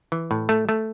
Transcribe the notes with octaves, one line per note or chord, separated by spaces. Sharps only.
E3
A2
A3
A3